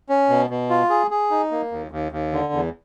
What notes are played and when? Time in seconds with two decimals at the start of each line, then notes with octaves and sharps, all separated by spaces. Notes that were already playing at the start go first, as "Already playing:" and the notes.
0.09 C#4
0.29 B2
0.50 B2
0.70 F4
0.90 G#4
1.11 G#4
1.31 D#4
1.51 A#3
1.72 D#2
1.91 D#2
2.12 D#2
2.32 D3
2.53 E2